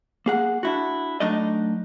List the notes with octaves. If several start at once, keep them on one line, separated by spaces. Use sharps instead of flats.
A#3 G#4 F#5
D4 E4 F#4
F#3 A3 D4 D#4 D5 D#5